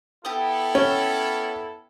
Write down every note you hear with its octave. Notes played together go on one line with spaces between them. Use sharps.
B3 E4 G4 A4 G5 D#6
C#4 G5